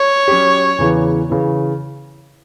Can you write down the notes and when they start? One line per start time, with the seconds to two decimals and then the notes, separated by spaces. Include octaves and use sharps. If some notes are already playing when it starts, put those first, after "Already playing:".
Already playing: C#5
0.28 F#3 C#4 G4
0.78 E2 C#3 E3
1.30 C#3 E3